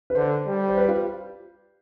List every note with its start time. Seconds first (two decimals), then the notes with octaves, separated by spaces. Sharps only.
0.10 B4
0.15 D3 C5
0.46 G3
0.68 C5
0.77 B4
0.83 G4
0.88 F4